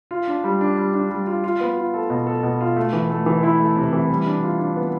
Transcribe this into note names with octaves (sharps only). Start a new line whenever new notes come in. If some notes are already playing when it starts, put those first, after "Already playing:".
F4
D4
G3
D4
G3
D4
G3
F4
F4
B3
F4
A4
B2
A4
B2
F4
A3
E3
A3
E3
E4
A3
C3
E3
G3
D4
F4
D4
B3